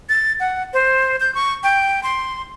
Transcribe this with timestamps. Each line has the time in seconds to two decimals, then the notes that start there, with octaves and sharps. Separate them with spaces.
0.09 A6
0.40 F#5
0.74 C5
1.20 G6
1.35 C#6
1.63 G5
2.03 C6